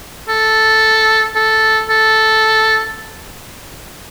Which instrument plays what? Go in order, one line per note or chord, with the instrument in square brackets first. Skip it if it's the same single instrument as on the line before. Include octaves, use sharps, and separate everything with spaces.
[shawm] A4
A4
A4